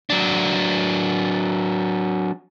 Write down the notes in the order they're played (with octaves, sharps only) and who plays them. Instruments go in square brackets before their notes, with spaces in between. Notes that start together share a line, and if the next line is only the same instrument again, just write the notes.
[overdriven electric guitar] F#3 D4